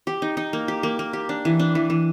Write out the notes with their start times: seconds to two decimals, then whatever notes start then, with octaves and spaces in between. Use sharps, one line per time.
0.07 G4
0.22 D#4
0.37 D#4
0.53 A#3
0.68 G4
0.83 A#3
0.99 A#3
1.13 G4
1.29 D4
1.45 E3
1.59 D4
1.75 E3
1.90 E3